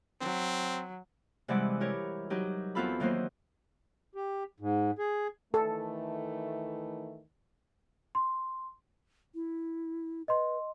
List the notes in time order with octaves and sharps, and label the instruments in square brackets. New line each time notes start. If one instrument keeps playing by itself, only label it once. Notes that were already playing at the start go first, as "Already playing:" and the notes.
[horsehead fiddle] F#3 [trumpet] C4
[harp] C3 E3 G3 G#3 D5 F#5
E4 G4 A#4 C#5
F#3 D#4 G4
E2 B3 C4 F4 A4 B5
D#3 E3 F#3 A#3 C5
[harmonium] G4
G#2
G#4
[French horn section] D#3 E3 A3 [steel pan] A4
[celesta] C6
[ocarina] E4
[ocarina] B4 [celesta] D#5 C6